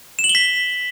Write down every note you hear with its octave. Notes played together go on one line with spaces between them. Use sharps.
E7
F#7
G7
B6